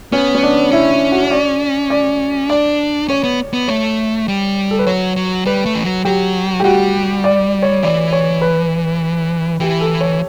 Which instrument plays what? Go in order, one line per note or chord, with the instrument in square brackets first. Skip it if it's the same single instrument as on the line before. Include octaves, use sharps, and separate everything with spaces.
[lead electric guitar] B3 [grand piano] C#4
[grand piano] C#4
D4
[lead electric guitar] C#4 [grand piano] E4
[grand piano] E4
F#4
D5
D5
[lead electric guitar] D4 [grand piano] D5
[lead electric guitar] C#4 [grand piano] C#5
[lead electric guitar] B3
B3
[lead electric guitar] A3 [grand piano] C#5
[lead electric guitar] G3
[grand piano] A4
B4
[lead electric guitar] F#3 [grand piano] C#5
[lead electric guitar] F#3
[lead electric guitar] G3 [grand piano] B4
[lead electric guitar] A3
E3
F#3
[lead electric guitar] F#3 [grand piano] G4
[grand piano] G4
[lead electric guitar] G3 [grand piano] F#4
[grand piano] D5
C#5
[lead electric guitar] E3 [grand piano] D5
[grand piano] C#5
B4
[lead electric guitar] E3 [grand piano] G4
[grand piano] A4
C#5